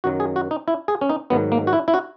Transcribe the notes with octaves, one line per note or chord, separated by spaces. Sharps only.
F#2 D#3 F#3 F#4
G#4
F#4
D#4
E4
G#4
C#4
D#4
G#2 D#3 F#3 B3
A#3
F#4
E4
E4
F#4